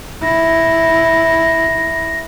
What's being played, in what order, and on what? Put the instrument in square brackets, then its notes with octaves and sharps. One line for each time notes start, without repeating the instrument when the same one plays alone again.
[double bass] E4 [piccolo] A#6